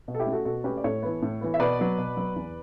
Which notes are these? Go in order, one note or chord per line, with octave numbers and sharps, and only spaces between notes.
B2
A4
E4 G4
A3 C#4
F#4 A4
B2 F#4 A4
A3 C#4 G4 B4
D5
A2 A4 C#5
E3 B3
A2
E3 B3
E5
B2 B4 D5
F#3 B3
B2
F#3 B3
E2